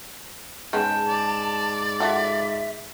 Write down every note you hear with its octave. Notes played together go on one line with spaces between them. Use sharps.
G#2 G#3 B3 C#4 G5 A5
D5
F4 F#4 A4 E5